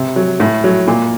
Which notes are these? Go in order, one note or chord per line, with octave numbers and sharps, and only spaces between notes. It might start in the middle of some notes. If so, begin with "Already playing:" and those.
Already playing: C3
F#3
A2
F#3
A#2